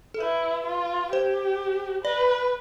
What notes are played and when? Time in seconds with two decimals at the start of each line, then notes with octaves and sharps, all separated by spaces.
0.14 A4
0.20 E4 B4
0.66 F4
1.12 G4 C5
2.04 B4 D5